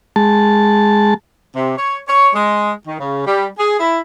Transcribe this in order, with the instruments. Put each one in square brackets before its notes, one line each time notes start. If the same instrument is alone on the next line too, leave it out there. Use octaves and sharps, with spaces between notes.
[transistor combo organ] G#3 A5
[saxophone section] C3
C#5
C#5
G#3
D#3
C#3
G3
G#4
E4